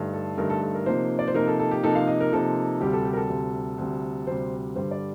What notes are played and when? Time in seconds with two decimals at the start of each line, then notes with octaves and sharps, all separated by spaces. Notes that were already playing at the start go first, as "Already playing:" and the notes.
Already playing: G2 D3 A3 D#4
0.14 A4
0.38 G2 D3 A3 D#4 A#4
0.50 A4
0.62 A4
0.74 A#4
0.86 C3 F3 A#3 D#4 C5
1.19 D5
1.28 C5
1.34 C3 F3 A#3 D#4 A#4
1.47 A4
1.59 A4
1.71 G4
1.84 C3 F3 A#3 D#4 A4
1.95 F5
2.07 D#5
2.20 A#4
2.33 C3 F3 A#3 D#4 A4
2.80 D2 C3 G3 G4
2.93 A4
3.05 G4
3.13 A#4
3.17 A4
3.29 D2 C3 G3
3.78 D2 C3 G3
4.27 D2 C3 G3 C5
4.75 G2 D3 G3 C5
4.91 D5